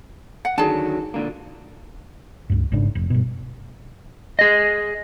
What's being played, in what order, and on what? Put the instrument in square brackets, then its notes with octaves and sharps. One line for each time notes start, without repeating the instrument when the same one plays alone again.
[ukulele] F#5
[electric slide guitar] D3 D#3 F#3 [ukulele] G#4 A5
[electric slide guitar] A#2 D3 A#3
[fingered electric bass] C#2 G2
G#1 G#2 C#3 D4
F1
G2 B2
[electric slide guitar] G#4 D#5